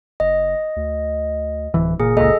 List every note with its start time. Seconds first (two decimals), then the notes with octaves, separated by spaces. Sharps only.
0.20 F#1 D#5
0.76 D2
1.74 D1 E3
2.00 F#1 A#2 G#4
2.17 C#2 A#2 A4 D#5